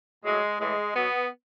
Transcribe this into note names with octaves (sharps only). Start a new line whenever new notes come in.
A2 F#3 G#3
A2 E3 G#3
B2 F#3 B3